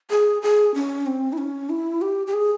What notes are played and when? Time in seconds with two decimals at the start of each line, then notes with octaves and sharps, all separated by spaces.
0.10 G#4
0.42 G#4
0.74 C#4
1.06 C4
1.33 E4
1.38 C#4
1.70 E4
2.01 G4
2.27 G4
2.33 G#4